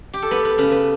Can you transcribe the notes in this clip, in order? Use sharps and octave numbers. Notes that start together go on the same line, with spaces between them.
G4
A4
B3 B4
B4
C#3 B4
B4